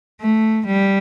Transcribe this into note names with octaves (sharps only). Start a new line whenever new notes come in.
A3
G3